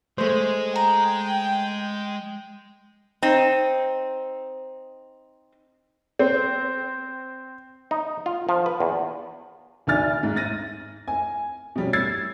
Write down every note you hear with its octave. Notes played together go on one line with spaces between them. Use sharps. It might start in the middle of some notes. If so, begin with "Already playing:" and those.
G#3 A3 C5
G5 A#5
C4 D#4
C4
D#4
F4
F3
B4
E2
D2 D#3 D5 G#5 F6 A6
G#2
A6 A#6 D#7
G#5
B2 G3 C#4
E6 G#6 A6 C7